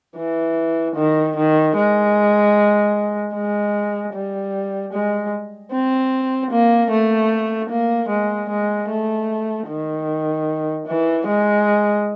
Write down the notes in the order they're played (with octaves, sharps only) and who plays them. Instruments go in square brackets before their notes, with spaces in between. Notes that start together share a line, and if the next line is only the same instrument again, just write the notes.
[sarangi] E3
D#3
D#3
G#3
G#3
G3
G#3
C4
A#3
A3
A#3
G#3
G#3
A3
D#3
E3
G#3